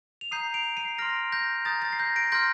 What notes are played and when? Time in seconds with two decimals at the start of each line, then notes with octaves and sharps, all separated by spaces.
0.21 F7
0.31 A#5 D#6 G6 C7 D#7
0.54 D7 F7
0.77 C7 D#7
0.98 C6 F6 A#6 D7
1.32 G6 A#6
1.65 A#5 D#6 G6 A6
1.82 A6
1.93 C7
1.99 G6 A#6
2.16 A#6 D7
2.32 C6 F6 G6 A#6